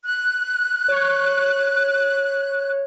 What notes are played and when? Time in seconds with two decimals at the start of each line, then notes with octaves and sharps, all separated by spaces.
0.04 F#6
0.88 C#5